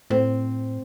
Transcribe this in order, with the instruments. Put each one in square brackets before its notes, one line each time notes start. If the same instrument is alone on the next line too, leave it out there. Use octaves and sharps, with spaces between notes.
[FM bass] A2 [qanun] C4